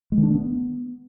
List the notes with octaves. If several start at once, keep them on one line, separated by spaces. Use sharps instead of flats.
G#3
D#3
D4
A3
B3